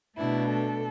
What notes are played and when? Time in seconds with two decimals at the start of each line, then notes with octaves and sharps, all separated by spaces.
0.17 B2 A3 D4 E4
0.49 A4